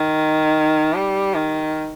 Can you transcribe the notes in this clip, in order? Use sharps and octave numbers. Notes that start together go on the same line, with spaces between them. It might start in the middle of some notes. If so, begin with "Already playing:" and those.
Already playing: D#3
G3
D#3